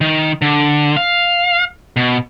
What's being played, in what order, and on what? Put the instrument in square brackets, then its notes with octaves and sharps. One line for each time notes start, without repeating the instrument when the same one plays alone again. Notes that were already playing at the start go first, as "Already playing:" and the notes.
[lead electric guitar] D#3
D3
F5
B2